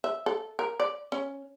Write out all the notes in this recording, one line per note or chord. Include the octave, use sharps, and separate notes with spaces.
E5
A4
A#4
D5
C#4